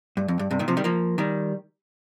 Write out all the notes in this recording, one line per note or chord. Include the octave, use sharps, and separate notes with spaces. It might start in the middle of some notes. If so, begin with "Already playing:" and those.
G2
F2
G2
G2 C3
A#2 D#3
C3 F3
D#3 G3
F3 A#3
D#3 G3